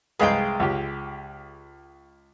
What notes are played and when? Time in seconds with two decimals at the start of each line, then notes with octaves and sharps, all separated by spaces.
0.19 C2 G#3 G#4 B4 F5 G5
0.60 C#2 G4